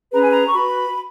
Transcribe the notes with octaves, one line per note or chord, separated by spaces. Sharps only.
C#4 G#4 B4 A#5
G#5
A#5
C#6
F#4 B4 B5